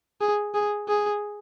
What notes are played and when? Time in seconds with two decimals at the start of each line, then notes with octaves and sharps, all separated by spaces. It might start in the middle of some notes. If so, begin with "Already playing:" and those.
0.21 G#4
0.54 G#4
0.88 G#4